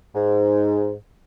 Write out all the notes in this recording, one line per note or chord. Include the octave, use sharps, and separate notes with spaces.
G#2